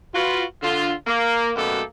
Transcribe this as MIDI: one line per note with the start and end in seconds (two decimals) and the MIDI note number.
0.14 0.43 65
0.14 0.43 66
0.14 0.43 71
0.62 0.93 50
0.62 0.93 65
1.07 1.51 58
1.56 1.82 42
1.56 1.82 47
1.56 1.82 57
1.56 1.82 58
1.56 1.82 67
1.56 1.82 69